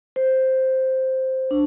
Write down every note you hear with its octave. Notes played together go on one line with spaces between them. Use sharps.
C5
D4